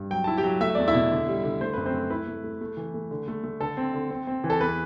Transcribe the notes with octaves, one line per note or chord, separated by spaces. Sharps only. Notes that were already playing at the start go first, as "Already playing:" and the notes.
Already playing: G2
F#3 G5
E4 A5
G4 G5
F#3
A3 E5
E2 D5
E4 E5
B2
D3
G3
D3
A3 C5
F#2 B4
C4 C5
A3
E4 B4
A3
A3
A3
E3
A3
D3
A3
A3
D3 A4
C4
D3
C4
C4
E3
A4
E2 B4